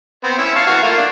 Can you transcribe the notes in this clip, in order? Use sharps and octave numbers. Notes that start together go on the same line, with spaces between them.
B3 C4
C#4 E4 E5
F5 A5 C#6
E3 F#4 F5
A3 A#3 F4
D4